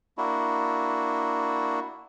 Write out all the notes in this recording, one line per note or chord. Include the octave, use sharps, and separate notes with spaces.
A#3 D4 E4 F#4